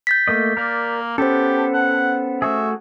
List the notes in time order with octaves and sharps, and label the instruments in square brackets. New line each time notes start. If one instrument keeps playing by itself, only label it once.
[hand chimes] G6 A6 B6
[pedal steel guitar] A3 A#3 D#5
[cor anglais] A#3 [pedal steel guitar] A#4 D5
[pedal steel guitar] B3 A4 [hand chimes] C#4 C5 [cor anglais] G4
[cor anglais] F#5
[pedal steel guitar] A3 F#4 G#4 [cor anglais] E5